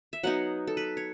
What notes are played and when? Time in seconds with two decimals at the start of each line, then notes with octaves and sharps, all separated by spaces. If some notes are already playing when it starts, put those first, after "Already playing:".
0.13 E5
0.23 F#3 B3 D#4 F#5
0.67 A4
0.77 B4
0.97 C#5